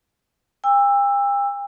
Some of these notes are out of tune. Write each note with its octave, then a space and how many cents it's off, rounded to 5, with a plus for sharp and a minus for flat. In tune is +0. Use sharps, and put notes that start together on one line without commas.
G5 +45 E6 +5